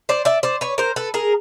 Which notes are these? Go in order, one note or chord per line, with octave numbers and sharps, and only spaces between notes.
C5 D5
D5 E5
C5 D5
B4 C#5
A#4 C5
A4 B4
G#4 A#4